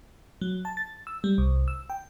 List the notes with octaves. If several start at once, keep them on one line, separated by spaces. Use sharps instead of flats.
F#3
A5
A6
E6
G3
C2
E6
G5